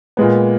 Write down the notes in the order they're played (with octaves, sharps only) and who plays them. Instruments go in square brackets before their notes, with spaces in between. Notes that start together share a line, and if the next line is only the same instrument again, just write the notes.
[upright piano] A#2 G#3 B3